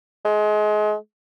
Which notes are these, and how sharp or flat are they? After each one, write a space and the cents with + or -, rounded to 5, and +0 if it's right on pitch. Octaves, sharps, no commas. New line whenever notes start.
G#3 +30